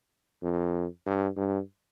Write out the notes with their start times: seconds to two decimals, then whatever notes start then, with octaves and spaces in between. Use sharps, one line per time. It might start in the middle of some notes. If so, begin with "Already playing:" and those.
0.42 F2
1.06 G2
1.37 G2